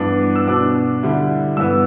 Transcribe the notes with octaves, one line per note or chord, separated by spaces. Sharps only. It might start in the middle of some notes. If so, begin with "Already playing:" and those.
Already playing: G2 E3 B3 D4
E6
B2 B3 D4 D6
D3 G3 E4
G2 E3 B3 E6